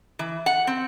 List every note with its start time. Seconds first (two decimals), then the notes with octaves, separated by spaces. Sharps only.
0.19 E3
0.46 F#5
0.67 C4